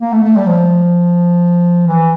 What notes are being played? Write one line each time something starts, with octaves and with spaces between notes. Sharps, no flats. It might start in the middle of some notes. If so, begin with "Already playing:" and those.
A#3
A3
A3
G3
F3
E3